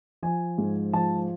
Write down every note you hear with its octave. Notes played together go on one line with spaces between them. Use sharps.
F3 G#5
G#2
F3 A5